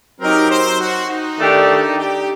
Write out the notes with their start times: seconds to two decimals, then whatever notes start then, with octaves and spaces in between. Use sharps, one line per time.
0.21 F#3 C4 D#4 G4 A#4
0.50 C5
0.79 F#4
1.09 D#4
1.39 D#3 A3 D4 G4
1.98 G4